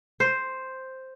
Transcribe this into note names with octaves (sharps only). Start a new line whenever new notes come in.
C5